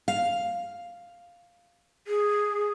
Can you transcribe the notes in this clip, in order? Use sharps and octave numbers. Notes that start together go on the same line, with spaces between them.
F5
G#4